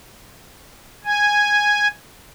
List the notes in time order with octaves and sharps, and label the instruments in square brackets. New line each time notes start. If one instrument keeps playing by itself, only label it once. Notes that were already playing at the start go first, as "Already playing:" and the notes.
[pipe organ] G#5